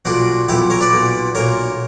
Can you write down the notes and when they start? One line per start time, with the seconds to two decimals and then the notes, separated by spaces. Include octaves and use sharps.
0.05 B1 A#2 D4 F#4
0.49 B1 A#2 E4 G4
0.70 A#4 C#5
0.81 B4 D5
0.92 B1 A#2
1.35 B1 A#2 A#4 C#5